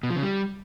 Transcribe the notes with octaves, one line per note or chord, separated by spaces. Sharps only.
B2
F3
C#3
G3